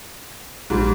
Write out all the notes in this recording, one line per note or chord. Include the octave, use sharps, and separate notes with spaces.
A#1 G#2 G3